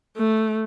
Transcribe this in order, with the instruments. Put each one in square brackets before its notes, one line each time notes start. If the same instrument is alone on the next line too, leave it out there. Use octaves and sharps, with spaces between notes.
[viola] A3